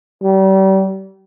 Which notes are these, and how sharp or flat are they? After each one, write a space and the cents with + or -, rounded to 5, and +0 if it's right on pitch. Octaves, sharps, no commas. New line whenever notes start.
G3 -35